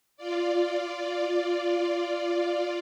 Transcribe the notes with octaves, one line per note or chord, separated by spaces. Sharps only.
F4 D5